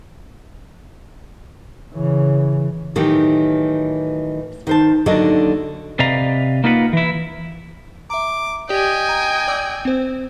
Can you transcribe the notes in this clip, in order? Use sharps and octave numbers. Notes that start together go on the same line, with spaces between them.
C#3 E3
A2 D#3 E3 F#3 G4
D#3 C5 A5
D#2 D3 F#3 D4 D#5
C3 B4 D5 D#5 F5 A#5
A#3 D#4 F4 B4 F#5
E3 E4
E5 A#5 D6
G4 D5 D#5 G5 G#5
A#5
D5 D6 E6
C4 C5